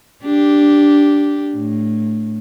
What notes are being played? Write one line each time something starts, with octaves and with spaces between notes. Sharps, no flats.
D4 G4
A2